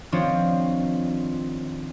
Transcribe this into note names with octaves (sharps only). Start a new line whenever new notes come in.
D#3 F3 C4 D4 F4 C#5